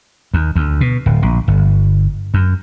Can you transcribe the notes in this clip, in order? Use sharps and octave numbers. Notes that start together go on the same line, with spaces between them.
D#2
D2
B2
D1
A#1
G1
F#2